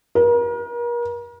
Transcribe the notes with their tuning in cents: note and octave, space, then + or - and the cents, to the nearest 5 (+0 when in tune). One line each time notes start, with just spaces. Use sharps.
A#4 +40